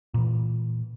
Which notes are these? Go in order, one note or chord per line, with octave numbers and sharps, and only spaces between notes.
A#2 E3